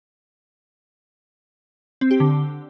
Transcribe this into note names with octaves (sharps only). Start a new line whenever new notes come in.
C4
G4
D3